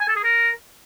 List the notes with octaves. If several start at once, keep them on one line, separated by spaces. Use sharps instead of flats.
G#5
A4
G#4
A#4